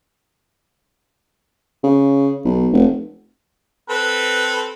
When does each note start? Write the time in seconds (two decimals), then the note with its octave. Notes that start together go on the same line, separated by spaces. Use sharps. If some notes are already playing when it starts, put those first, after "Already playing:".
1.84 C#3
2.45 B1
2.73 F1
3.90 C4 A4 B4